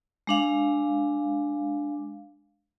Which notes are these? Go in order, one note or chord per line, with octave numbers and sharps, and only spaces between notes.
G#3 D4 F5